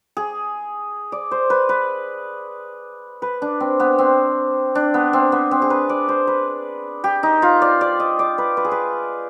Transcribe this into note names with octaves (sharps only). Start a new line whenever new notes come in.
G#4
D5
C5
B4
B4
B4
D4
C4
B3
C4
D4
B3
C4
B3
C4
G#4
B4
D5
C5
B4
G4
D#4
F4
D5
D5
D#5
D5
B4
B4
G#4
B4